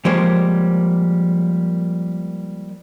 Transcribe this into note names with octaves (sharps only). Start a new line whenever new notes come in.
F3 G3 G#3 A#3 C5 C#5